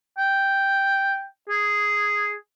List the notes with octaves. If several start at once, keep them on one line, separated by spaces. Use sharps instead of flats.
G5
G#4